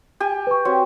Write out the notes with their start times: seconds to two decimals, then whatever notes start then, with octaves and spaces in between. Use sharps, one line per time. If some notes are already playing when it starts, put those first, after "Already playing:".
0.20 G4 G#5
0.47 B4 C#6
0.65 C4 F#4 C#5